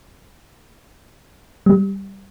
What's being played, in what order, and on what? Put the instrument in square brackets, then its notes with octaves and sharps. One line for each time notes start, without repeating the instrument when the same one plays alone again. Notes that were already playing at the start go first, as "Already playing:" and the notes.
[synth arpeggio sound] G3